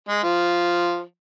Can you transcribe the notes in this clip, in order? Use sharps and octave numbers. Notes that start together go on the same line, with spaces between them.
G#3
F3